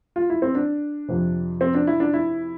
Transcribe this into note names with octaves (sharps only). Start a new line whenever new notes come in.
F4
E4
C4
D4
F2 C3 F3
C4
D4
E4
D4
E4